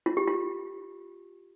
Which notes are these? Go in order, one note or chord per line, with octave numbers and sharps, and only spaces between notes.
F4
G4
F4